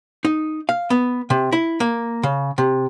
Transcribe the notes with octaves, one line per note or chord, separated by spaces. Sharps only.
D#4
F5
B3
C3
E4
A#3
C#3
C3